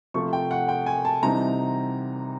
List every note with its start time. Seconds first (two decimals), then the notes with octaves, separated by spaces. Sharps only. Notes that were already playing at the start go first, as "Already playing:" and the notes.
0.14 C3 F3 A3 C#6
0.33 G5
0.51 F#5
0.68 G5
0.86 G#5
1.05 A5
1.23 C3 E3 G3 C4 D#4 A#5